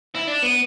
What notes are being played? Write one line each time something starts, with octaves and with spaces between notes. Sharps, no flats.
E4
D4
B3